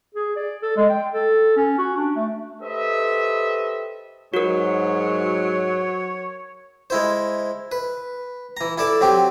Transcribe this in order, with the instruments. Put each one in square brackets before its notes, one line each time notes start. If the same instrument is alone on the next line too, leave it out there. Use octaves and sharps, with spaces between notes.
[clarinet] G#4
D5
A4
G#3
G5
A4
C#4
F#4
D4
A3
[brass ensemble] G4 A4 B4 C5 D#5 E5
[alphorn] G#2 [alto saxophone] F#3 [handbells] F#4 A#4 [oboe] C#5
[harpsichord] G#3 E4 C5
B4
E3 A#5
E4 A4 D5 A5
F#3 C4 G4